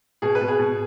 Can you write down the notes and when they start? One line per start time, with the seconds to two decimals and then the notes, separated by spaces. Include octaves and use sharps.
0.22 B2 G#4
0.35 B4
0.41 B2
0.48 G#4
0.59 B2